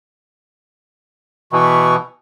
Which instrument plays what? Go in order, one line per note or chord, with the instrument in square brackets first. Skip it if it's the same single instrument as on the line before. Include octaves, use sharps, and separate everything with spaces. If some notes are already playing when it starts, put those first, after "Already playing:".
[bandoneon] B2 E3 [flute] C#6